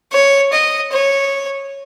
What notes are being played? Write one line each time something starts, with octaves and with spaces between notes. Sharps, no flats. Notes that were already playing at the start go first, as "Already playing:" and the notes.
C#5
D#5
C#5